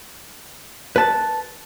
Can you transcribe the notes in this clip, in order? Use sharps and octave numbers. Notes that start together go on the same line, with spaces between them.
B4 A5